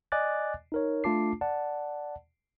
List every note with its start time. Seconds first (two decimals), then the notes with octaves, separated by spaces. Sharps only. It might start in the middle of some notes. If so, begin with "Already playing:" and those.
0.12 D5 D#5 G#5 D6 F#6 A6
0.72 D#4 A#4 C#5
1.04 A3 D4 F4 A5 D6 C7
1.41 D5 F#5 A5